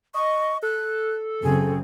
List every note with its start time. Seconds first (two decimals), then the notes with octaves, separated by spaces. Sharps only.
0.14 D#5 C#6
0.63 A4 F#6
1.43 F#2 C#3 C4 G#4